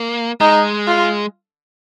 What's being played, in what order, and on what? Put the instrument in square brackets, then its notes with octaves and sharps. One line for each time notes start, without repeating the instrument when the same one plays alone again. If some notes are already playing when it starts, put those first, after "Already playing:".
Already playing: [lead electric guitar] A#3
[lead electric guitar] G#3 [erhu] D#4
[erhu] F4